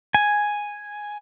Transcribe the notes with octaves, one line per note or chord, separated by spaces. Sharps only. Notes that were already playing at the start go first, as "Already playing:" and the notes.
G#5